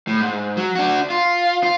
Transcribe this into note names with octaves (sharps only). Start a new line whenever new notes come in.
A2
G#2
F#3
D4 F#4
F4
F4